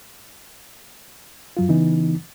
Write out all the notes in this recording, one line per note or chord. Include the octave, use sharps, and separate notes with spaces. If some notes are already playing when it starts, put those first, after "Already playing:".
F#2 F#3 F4
C#3 E3 B3 D#4